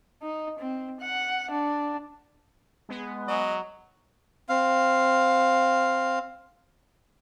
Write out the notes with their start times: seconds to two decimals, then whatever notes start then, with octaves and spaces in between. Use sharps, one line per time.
0.23 D#4
0.59 C4
1.00 F#5
1.51 D4
2.89 G#3 B3
3.28 F#3 D#5
4.49 C4 F5